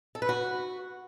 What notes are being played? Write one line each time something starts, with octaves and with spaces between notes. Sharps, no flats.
A4
B4
F#4